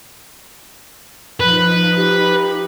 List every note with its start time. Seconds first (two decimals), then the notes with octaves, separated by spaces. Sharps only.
1.40 F3 D#4 B4
1.97 G4